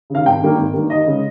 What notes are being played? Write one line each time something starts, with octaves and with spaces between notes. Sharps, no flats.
D#2 C#3 F5
G#1 G5
G2 D#3 A#3
G#1
G2 D#3 A#3
D#2 D#5
C#3 G#3